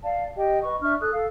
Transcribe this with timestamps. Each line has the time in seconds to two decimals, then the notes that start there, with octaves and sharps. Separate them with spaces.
0.03 D5 F5 A5
0.36 G4 D#5 G5
0.62 B4 D#5 C#6
0.81 D4 E5 C#6 F6
1.00 A4 D#6 F#6
1.13 A4 F5